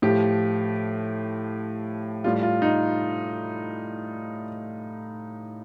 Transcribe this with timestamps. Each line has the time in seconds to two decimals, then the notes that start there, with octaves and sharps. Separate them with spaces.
0.02 A2 F3 G4
2.24 A2 G3 F4
2.43 F4
2.62 D#4